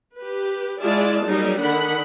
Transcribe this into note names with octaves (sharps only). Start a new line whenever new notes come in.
G4 B4
G#3 E4 F4 G#4 D5 A5
F#3 G3 A#3 D#4 G#4
D3 D#3 D4 F#5 B5